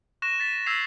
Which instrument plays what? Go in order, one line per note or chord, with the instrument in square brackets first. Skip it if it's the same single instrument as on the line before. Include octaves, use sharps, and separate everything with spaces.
[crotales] C#6 F#6 A#6 E7
A6 B6
E6 G#6 B6 C7 F7